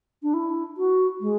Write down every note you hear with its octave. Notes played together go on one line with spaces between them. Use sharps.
D4
E4
F#4
G#3